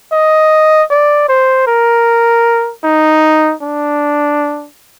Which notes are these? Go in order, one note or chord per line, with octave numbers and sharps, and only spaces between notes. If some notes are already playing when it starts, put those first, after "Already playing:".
D#5
D5
C5
A#4
D#4
D4